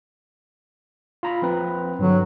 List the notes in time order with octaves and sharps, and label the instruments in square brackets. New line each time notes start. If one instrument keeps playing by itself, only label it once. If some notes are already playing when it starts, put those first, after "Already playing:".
[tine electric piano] F4 A#5 B5
F3 C4 B4
[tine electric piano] G2 D3 [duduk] F#3